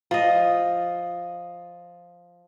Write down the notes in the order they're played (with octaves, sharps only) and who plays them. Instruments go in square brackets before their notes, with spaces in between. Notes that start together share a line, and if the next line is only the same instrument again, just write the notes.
[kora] F3 D#5